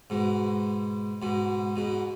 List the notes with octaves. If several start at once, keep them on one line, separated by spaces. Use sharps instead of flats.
G#2 B2
G#2 B2
G#2 B2